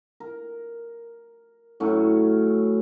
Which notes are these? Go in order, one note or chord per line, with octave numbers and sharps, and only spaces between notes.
A#4
A2 F#3 C#4